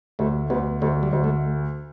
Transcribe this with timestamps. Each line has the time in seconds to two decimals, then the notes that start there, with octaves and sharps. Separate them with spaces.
0.19 D2 A3
0.50 D2 B3
0.82 D2 A3
1.03 G3
1.13 D2
1.24 A3